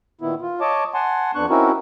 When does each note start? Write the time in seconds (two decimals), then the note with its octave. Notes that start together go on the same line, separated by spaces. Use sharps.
0.21 A#2 D#3 B3 E4
0.42 F4
0.61 C#5 D#5 A5 D6
0.94 F#5 G#5 A5 C6
1.35 F2 B3 D4 C#6 F#6
1.50 C4 C#4 D#4 E4 F#4 A#4